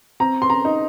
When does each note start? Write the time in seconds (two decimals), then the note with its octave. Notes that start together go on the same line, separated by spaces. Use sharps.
0.20 C4 A#5
0.42 C6
0.50 A#5
0.65 D#4